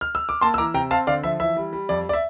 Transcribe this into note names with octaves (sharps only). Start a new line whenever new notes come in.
F6
E6
D6
A#3 A5 C6
E6
E3 A#5 D6
C3 G5 A#5
C4 F5 A5
D3 D5 F5
F3 E5
E3 E5
G3
G3
F2 D5
D5
E5